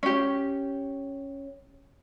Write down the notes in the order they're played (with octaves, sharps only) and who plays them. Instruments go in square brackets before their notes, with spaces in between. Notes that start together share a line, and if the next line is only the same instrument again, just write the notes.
[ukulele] C#4 G4